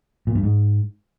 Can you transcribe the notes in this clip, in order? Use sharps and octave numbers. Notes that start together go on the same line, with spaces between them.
A#2
G2
G#2